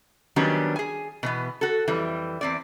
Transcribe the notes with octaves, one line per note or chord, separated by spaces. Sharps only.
D#3 F#3 G3 B3 C#4 D4
G#4 G#5
B2 E3 B3
F#4 A4
F2 E3 G3
E2 C4 D5